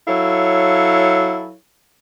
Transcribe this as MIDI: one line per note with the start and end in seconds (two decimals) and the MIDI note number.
0.07 1.54 54
0.07 1.54 64
0.07 1.54 69
0.07 1.54 73
0.07 1.54 77